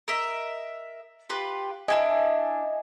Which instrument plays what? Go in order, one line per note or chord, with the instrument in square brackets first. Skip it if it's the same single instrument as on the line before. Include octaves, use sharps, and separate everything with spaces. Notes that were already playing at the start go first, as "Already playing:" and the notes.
[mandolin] A#4 D#5 E5
F4 G4 B4
[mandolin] D4 E4 G4 [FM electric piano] D#5 G#5